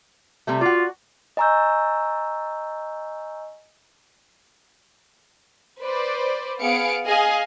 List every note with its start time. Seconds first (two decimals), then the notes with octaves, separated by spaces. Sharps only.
0.47 C3 G3 A3
0.61 F4 F#4 D5
1.37 D#5 G#5 A#5 C#6 E6 G6
5.80 B4 C5 D5
6.60 B3 G#4 F5 C#7 D7
7.05 G#4 D#5 F5 G#5